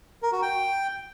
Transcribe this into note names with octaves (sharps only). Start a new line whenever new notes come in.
A#4
F#4
G5